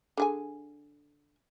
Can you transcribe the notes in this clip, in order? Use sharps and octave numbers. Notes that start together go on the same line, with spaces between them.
D3 G#4 G#5